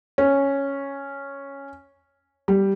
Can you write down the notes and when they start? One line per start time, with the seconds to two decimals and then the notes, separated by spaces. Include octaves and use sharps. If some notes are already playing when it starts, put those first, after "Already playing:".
0.18 C#4
2.48 G3